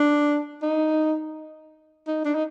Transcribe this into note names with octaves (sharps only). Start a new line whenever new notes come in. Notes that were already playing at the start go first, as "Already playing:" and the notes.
Already playing: D4
D#4
D#4
D4
D#4